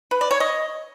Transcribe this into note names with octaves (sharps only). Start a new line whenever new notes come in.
B4
D5
C#5
D#5